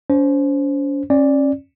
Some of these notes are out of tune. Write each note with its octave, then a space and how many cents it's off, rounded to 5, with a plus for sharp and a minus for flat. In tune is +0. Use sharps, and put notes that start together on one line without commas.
C#4 +40 C5 +0
C#4 -30 D5 +0